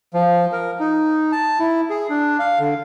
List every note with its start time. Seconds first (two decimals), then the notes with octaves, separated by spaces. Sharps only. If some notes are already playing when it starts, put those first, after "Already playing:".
0.14 F3
0.52 A#4
0.80 D#4
1.32 A5
1.59 E4
1.90 G#4
2.10 D4
2.39 F5
2.59 D3